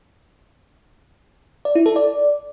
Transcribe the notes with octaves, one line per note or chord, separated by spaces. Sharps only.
D5
E4
A4
D5